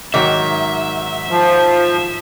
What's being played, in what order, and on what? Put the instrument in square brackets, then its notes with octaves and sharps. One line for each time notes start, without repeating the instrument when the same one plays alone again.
[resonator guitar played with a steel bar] G#2 D#3 F#3 [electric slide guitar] E5
[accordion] F3